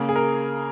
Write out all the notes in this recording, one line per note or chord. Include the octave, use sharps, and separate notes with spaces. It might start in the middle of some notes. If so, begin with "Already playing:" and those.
Already playing: C#3 A#3
G#4
A#4